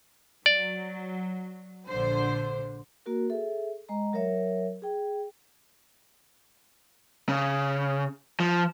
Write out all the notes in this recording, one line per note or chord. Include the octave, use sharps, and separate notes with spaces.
F#3 D5
A#1 D3 C5
A#3 F#4 A#4
G#4 A4 E5
G#3 D#5 A#5
F#3 A#4 C#5 E5
G#4 G5
C#3
F3